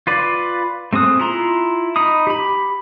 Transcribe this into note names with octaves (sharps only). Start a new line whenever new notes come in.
F4 B4 D5
A3 C4 G#4 D#6 F#6
E4 F4 A#5 C6
D#4 B5 D#6
G4 B5